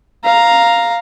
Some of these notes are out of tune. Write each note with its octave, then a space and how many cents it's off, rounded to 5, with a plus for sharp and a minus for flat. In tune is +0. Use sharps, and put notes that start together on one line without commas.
F5 +0 A#5 +0